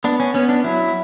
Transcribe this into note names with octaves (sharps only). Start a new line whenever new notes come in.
B3 D4
C#4
B3 C#4
D4
F#3 E4